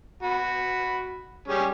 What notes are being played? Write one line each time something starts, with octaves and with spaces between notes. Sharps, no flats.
F#4 B5
G3 C#4 G#4